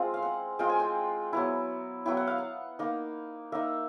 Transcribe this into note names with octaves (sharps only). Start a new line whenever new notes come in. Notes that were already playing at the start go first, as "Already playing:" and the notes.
Already playing: G#3 C4 F4
F5
F#5
G#3 C4 F4 G5
G#5
G5
F#3 B3 E4
F#3 B3 E4 G5
F#5
F5
F#5
A#3 D#4
A#3 D#4 E5